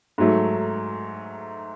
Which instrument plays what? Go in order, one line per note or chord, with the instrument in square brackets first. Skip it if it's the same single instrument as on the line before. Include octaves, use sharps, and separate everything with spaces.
[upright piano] G#2 F#3 A3